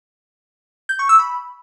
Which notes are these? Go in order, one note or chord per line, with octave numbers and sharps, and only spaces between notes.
G6
C#6
E6
B5